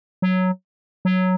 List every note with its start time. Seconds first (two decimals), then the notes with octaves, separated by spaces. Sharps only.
0.22 F#3
1.05 F#3